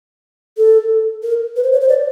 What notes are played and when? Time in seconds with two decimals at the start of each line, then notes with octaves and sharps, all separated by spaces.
0.57 A4
1.23 A#4
1.56 B4
1.63 C5
1.72 C#5
1.81 C5
1.89 D5